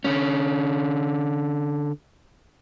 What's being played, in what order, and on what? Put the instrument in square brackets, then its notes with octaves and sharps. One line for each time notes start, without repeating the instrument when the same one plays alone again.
[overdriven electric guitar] D3 C#4